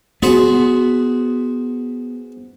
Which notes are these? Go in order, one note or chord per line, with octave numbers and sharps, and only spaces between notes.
B3 F#4 G#4 C5